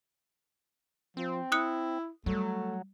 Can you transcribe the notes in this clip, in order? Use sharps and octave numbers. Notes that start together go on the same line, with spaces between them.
F3 C4
E4 D#6 F#6 C#7
F#3 G3 A3